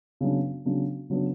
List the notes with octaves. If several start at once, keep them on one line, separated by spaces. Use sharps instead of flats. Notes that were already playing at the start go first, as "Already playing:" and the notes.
C#3 F#3 B3 D4
C#3 F#3 B3 D4
C#3 F#3 B3 D4